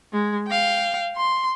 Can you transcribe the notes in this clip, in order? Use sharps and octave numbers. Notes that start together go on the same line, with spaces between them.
G#3
F5 G5
C6